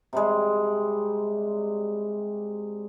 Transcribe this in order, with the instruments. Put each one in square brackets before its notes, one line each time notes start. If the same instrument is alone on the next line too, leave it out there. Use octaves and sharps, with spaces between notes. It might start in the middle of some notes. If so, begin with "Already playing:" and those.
[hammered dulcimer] C3 G3 G#3